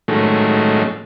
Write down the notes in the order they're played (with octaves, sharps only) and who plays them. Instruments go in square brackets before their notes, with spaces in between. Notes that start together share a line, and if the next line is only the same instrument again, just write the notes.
[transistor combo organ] A2 D#3 F#3 G#3 A3 C#4